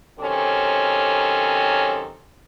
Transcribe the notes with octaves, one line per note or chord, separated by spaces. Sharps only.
C3 D#3 F#3 C4 C#4 A4